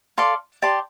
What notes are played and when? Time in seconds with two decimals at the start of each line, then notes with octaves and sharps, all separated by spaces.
0.18 A4 D5 F5 C6
0.62 G4 D5 A5 C6